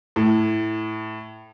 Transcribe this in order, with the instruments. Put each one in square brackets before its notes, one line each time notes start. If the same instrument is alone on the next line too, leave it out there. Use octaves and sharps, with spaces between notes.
[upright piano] A2